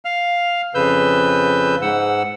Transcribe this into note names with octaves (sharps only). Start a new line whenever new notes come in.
F5 F6
F2 C#3 B4 E6 G6
G#2 F#5 E6